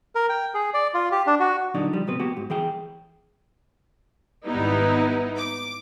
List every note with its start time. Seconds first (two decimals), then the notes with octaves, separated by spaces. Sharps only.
0.15 A#4
0.29 G5
0.54 G#4
0.74 D5
0.94 F4
1.12 G4
1.27 D4
1.40 F#4
1.74 A#2 D3 F#3 D4 D#4
1.93 F3 G3
2.07 C#2 G2 B2 F#3 C4 B4
2.20 A#3 B3 F#4 G4
2.36 G#2
2.50 E3 G#4 G5
4.46 G#1 G3 B3 D#4 E4
5.36 D6